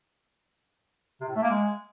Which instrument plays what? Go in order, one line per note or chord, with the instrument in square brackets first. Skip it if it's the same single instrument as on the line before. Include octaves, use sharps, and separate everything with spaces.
[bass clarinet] C3
A2
A3
A#3
G#3